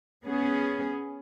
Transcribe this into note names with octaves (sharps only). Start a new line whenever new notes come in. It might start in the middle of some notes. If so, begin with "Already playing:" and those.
B3 C#4 G#4